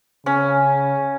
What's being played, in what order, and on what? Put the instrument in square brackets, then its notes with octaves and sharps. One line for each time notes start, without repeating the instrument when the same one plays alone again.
[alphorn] C#3 [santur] C#4